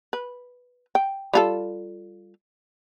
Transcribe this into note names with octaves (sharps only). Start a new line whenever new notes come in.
B4
G5
G3 F4 A4